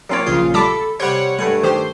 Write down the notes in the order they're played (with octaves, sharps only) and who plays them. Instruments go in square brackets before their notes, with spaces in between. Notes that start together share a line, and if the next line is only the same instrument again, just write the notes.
[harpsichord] A#2 F4 D6 [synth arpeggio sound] F#3 C4 C#5
[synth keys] A#1 C#3 F4 [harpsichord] G#4
[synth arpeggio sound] G3 A5 D6 [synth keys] A4 [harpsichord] E5 B5
[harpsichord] C3 G3 [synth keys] C#5 F#5 [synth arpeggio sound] G6
[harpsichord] G2 A3 G#5 [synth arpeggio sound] G3
[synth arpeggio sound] D#3 G4 [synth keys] C5